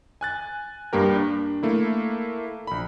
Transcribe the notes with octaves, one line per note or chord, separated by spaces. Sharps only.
G#5 F#6 A6
G2 A#3 G4 A#4
D4
A3 A#3 E4
A#1 B5